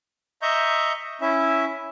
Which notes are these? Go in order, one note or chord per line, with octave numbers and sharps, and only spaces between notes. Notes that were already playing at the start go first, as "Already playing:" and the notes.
D#5 E5 A#5 C#6 G6
C#4 E4 E5